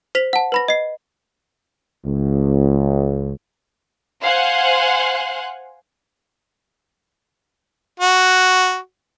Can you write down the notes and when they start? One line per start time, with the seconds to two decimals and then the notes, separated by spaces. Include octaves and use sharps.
0.15 C5 B6 F7
0.33 F#5 A5
0.52 B4 B5 A#6
0.68 D#5 C7
2.05 C#2
4.23 C5 F5 F#5 G#5 C6 F#6
8.00 F#4